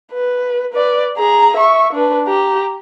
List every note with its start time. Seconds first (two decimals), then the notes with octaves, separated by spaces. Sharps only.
0.12 B4
0.73 B4 D5
1.18 G#4 A#5
1.57 E5 C#6
1.93 D4 B4
2.28 G4 A#5